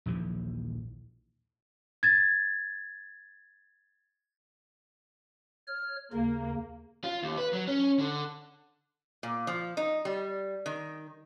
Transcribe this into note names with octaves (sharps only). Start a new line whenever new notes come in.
A#1 D#2 E3 F3
G#6 A6
C#5 F6
D#2 C#3 A#3
F4
D#2
B4
F#3
C#4
D3
A#2
F3
D#4
G3
D#3